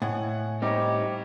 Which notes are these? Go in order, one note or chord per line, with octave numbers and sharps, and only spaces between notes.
A2 D#5 F#5 G#5
G3 C4 D#4 G4 C#5